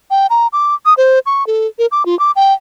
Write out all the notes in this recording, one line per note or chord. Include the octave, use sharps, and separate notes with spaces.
G5
A#5
D6
D#6
C5
C#6
A4
A#4
D6
F4
D6
G5